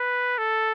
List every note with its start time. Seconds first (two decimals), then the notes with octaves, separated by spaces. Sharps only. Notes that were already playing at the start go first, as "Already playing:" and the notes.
Already playing: B4
0.38 A4